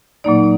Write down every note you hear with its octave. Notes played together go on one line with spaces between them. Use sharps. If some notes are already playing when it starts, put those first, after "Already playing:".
A#2 F#3 A#3 D#4 D5